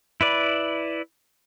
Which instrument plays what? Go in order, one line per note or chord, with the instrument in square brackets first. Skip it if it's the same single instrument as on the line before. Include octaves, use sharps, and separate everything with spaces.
[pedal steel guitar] E4 B4 D5